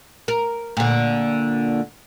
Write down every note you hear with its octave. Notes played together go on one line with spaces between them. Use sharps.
A#4
A#2 D3